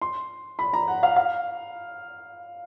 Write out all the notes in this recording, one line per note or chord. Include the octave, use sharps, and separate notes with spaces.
C6
B5
A#5
F#5
F5
F5